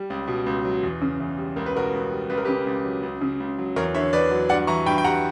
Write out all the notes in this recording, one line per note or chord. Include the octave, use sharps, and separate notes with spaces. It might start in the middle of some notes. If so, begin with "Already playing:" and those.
Already playing: G3
C#2
B2
C#2
F#3
E2
C#3
E2
G3
C#2 A#4
B4
B2 F#4 A#4
C#2
G3
C#2 B4
A#4
C#3 G4 B4
C#2
F#3
C#2
C#3
C#2
F#3
E2 A#4 C#5
D3 C#5 E5
E2 B4 D5
F#3
G2 D5 F#5
E3 A#5 C#6
G2 G5 B5
G5
G3 F#5 A#5